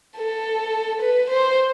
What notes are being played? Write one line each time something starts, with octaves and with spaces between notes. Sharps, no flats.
A4
B4
C5